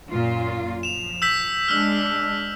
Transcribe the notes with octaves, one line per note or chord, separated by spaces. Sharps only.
F#2 A#2 F4
F3 E7 F7
E6 G6 B6
G#3 D4 E6 F6